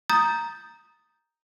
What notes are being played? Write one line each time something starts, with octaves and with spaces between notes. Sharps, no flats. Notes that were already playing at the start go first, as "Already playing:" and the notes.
A#5 D#6 G6 A6